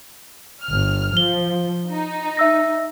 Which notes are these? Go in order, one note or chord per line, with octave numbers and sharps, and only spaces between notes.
G1 F6
F3 G7
D#4
E5 E6 A#6